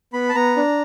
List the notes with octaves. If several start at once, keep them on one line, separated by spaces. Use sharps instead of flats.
B3 B5
A5
B3 A#5
D4